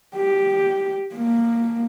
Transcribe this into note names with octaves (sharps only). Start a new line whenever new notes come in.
G4
A#3